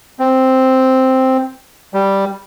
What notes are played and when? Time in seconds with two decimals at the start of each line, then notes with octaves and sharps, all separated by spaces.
0.19 C4
1.94 G3